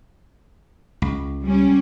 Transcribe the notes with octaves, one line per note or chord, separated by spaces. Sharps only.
C#2
G3 C#4